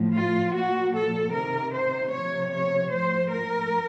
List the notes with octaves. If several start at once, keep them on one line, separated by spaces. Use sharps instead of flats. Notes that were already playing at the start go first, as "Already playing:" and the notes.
Already playing: A2 F3
F4
A#2 F3 F#4
A4
C3 D#3 A#4
C5
C3 F3 C#5
C#5
A2 F3 C5
A#4